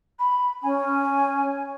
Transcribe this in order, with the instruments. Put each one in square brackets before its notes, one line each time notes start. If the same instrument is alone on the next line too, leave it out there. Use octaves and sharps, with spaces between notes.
[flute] B5
[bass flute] C#4 [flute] G#5